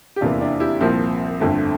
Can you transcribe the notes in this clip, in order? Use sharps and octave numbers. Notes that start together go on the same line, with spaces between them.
G4
F1 E2 C3 E3 A#3 D4 F4
D4
E4 G4
C2 A#2 F3 A#3 C4
G1 F2 D3 A3